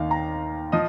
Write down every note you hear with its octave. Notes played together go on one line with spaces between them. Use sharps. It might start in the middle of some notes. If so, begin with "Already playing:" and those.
Already playing: D#2 D#3 F5
A#5
F3 D#5